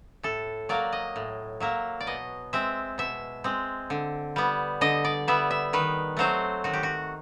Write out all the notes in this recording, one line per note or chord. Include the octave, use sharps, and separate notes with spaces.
A2 A4
F#3 A#3 D5
D#5
A2
F#3 A#3 E5
D5
B2 D#5
G#3 C4 E5
B2 E5
G#3 C4
D3
G3 B3
D3 D#5
D5
G3 B3 E5
E5
D#3 B4
F#3 A3 C4 C5
D#3 F#4
G4
F#4